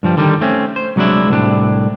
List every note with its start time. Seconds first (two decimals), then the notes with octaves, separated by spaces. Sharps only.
0.03 G2 F3 G3
0.17 D3 D#3 G3
0.41 A3 C4 C#4
0.76 C5
0.96 C2 F#3 G#3 D4 E4
1.29 C2 A2 D4